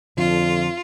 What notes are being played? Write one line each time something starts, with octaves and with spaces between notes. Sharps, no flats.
F2 D3 F3 D4 F4